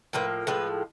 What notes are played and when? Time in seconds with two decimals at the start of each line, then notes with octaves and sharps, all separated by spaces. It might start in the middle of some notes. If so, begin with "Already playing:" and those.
0.13 A2 F3 A#3 B4
0.47 A2 F3 G#3 B4